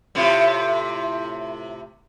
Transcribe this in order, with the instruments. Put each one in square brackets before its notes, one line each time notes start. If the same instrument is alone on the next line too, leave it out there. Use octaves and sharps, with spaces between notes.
[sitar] A2 C3 F4